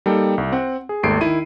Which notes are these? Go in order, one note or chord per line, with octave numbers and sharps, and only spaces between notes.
G3 A#3 D#4 A4 G5
C2
C4 F#5
G#4
G#1 D#2 A3 C7 D7
D#3 E4 D#7